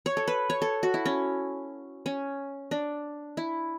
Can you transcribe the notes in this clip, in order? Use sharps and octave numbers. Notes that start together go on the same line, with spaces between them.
C#5
A4
B4
C#5
A4
F#4
E4
C#4
C#4
D4
E4